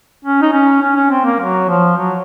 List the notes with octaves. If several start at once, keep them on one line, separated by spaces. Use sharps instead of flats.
C#4
D#4
C#4
C#4
C#4
C4
A#3
F#3
F3
F#3